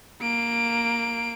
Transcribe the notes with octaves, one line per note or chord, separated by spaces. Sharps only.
A#3 D7